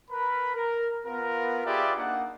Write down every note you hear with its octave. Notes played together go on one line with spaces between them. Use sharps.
A#4 B4 B5
A#4
B3 F4 A#4
F4 G4 G#4 B4 D5 E5
A#3 D4 D#4 F#5